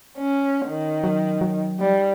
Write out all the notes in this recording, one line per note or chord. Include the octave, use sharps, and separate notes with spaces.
C#4
D#3
F#3
F#3
G3